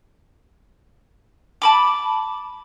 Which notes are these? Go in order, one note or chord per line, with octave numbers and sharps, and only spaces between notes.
A5 B5 D6